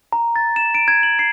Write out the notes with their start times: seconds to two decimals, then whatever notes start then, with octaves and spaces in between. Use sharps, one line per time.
0.13 A#5
0.36 A6
0.56 E7
0.75 D7
0.88 G#6
1.03 F#7
1.19 C7